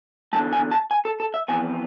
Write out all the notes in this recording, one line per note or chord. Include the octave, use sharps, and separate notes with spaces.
E2 D3 G#3 A5
G#5
A5
G#5
A4
A4
E5
F2 E3 B3 G#5